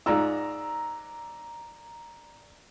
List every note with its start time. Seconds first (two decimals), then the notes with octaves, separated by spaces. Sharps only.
0.06 G#2 F4 D5 A#5 E6